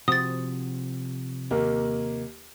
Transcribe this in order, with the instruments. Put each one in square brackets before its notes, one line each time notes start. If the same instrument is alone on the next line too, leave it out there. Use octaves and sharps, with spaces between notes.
[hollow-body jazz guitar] C3 F3 F#4 [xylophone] D#6 A6
[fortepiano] D#2 A#3